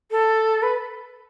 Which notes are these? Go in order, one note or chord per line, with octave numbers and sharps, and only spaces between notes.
A4
B4